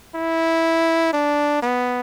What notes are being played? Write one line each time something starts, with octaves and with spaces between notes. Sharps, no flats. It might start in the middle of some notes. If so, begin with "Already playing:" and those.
E4
D4
B3